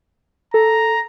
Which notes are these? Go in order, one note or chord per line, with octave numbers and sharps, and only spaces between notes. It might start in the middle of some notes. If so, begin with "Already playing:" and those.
A4 A#5